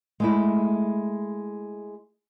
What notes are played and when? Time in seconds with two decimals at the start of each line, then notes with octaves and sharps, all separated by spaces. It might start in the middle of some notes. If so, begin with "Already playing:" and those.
0.20 G#3 A3 E4